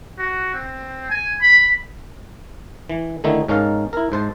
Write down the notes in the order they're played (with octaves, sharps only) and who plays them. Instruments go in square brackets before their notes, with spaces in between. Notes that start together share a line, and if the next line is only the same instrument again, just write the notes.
[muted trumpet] F#4
C4
G#5
B5
[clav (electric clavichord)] E3
D3 D#3 A3 D#4 E4
G#2 C#4 D#4 A#4 F5 A5
E4 A#4
G#2 C5 A5